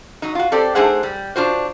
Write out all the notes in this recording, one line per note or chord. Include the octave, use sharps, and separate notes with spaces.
F#3 D#4
F4 F#4
C4 G4 A4 D5
A3 D4 D#4 G#4 C5 F#5
G3
D4 F4 F#4 C5